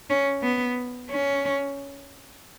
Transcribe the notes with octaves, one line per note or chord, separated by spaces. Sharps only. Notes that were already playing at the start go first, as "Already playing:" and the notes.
C#4
B3
C#4